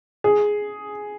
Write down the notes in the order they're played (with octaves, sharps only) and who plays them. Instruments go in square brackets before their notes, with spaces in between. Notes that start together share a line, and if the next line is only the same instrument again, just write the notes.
[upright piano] G#4